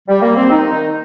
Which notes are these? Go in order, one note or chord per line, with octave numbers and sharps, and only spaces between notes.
G3
A#3
C4
D#3 D#4
D#3